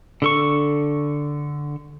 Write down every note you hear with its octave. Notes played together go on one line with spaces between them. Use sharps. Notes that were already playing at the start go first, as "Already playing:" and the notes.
D3 A4 C#6